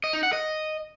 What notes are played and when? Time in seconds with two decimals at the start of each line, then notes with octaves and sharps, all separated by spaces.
0.04 D#5
0.13 D#4
0.23 F#5
0.33 D#5